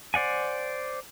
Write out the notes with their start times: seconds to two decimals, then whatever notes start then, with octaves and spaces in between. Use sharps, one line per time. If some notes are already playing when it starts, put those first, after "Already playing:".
0.14 C5 D5 F#5 G#5